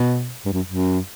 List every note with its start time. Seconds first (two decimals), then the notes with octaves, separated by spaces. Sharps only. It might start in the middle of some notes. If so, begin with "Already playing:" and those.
Already playing: B2
0.45 G2
0.53 F#2
0.69 F#2